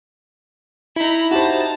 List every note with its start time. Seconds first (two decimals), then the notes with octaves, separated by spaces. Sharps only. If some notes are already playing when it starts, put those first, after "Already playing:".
0.96 D#4 E4 A#5 B5
1.31 F#4 G4 C5 A5 A#5